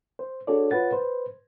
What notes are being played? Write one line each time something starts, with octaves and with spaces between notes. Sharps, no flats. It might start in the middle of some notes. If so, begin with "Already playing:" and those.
C5
D4 F#4 G#4 A4 C#5 D5
F4 B4 C#5 F#5 A6
B4 C5